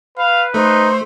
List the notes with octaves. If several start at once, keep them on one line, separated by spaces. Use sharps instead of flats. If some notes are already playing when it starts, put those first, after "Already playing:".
B4 F5
A3 D#4 C5